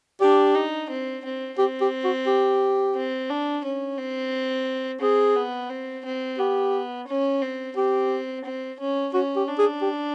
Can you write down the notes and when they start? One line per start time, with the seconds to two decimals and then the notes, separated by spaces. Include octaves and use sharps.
0.21 D4 G4
0.55 D#4
0.90 C4
1.25 C4
1.58 C4 G4
1.81 G4
2.04 F#4
2.27 G4
2.95 C4
3.30 D4
3.64 C#4
3.98 C4
5.01 C4 G#4
5.35 B3
5.70 C4
6.05 C4
6.39 B3 G4
7.08 C#4
7.42 C4
7.77 C4 G4
8.44 C4
8.80 C#4
9.13 C#4 F#4
9.36 G4
9.48 D4
9.59 G#4
9.82 G4